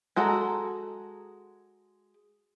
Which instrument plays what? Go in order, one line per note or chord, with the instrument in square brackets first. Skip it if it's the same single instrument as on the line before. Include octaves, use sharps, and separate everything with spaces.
[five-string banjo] G#3 F#4 A4 A5 A#5